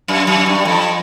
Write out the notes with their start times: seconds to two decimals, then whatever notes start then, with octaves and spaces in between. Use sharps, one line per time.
0.08 F#2
0.27 F#2
0.46 G2
0.65 F2